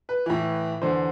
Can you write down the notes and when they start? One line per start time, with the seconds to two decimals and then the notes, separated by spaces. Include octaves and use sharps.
0.09 B4
0.26 A2 E3
0.82 E2 D3 C5